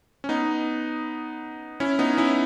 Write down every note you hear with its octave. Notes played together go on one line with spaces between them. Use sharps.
C#4
B3 D#4
C#4 E4
B3 D#4
C#4 E4